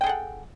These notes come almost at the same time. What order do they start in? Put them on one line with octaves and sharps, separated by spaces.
G5 G#4 A4 F#5